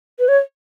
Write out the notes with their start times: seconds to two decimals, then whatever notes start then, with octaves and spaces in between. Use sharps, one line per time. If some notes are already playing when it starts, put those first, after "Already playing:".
0.19 B4
0.28 C#5